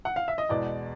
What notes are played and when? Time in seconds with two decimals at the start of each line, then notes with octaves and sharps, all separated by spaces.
0.05 F#5
0.16 F5
0.28 E5
0.38 D#5
0.49 E2 B2 G#3 D5